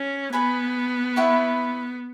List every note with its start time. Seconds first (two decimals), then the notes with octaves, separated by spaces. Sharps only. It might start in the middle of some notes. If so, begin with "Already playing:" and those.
Already playing: C#4
0.33 B3 B4 G#5 B5
1.16 E4 B4 F#5 C#6